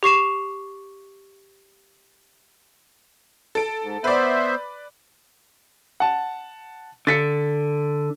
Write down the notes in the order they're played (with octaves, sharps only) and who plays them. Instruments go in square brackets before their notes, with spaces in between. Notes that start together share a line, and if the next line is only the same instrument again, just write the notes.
[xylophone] G4 C#6 C7 E7
[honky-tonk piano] A4 D7
[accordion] G#2
[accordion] B3 C5 E5 [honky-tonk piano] B4 D5
[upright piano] F#5 A5
[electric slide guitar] D3 [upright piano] A6 B6 C#7